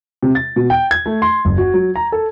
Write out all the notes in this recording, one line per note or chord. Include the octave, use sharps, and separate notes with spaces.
C3
A6
B2
G5
G#6
A3
C6
F#1
F#4
F#3
A#5
A4